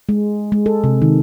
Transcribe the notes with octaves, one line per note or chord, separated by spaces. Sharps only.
G#3
G#3
A4
C3
D#3